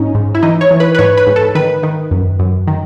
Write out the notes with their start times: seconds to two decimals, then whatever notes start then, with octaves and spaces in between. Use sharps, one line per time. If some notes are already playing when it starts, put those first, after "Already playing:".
Already playing: G#2 C#4 D#4
0.15 G#2
0.35 E4
0.43 E3 D#4
0.61 C#5
0.71 E3
0.80 B4
0.95 B4
0.99 G#2 C#5
1.17 B4
1.27 G#2
1.36 A4
1.55 D#3 B4
1.83 D#3
2.11 F#2
2.39 F#2
2.67 D#3